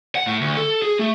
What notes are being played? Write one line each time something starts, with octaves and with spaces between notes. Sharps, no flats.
F#5
A2
D2
A4
G#4
A3